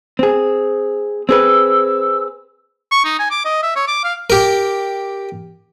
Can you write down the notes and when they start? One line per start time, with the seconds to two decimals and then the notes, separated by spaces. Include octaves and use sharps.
0.19 C4 G#4
1.29 C4 G#4 B4 E6
2.92 C#6
3.05 D#4
3.19 G#5
3.31 D6
3.45 D#5
3.63 E5
3.76 C#5
3.88 D6
4.04 F5
4.30 G4 A#4